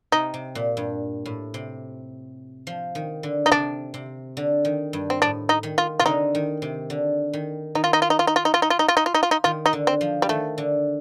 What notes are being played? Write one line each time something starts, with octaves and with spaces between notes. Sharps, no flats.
C3 D#4
C3
A#2
G2
A2
C3
F3
D#3
D3
D#4
C3 D4
C3
D3
D#3
G2
C4
A2 D4
D#4
D#3
F4
C3 F4
D3 D#4
D#3
C3
D3
D#3
D#3 D#4
F4
D#4
F4
D#4
F4
D#4
F4
D#4
F4
D#4
F4
D#4
F4
D#4
F4
D#4
F4
D#4
D#3 F4
D#4
D3
C4
F3
G3
D#3 A3
D3